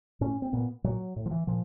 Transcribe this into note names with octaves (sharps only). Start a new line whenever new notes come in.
A2 C#4
C4
A#2 B3
A#2 F#3
A2
F3
E3
A#2 F3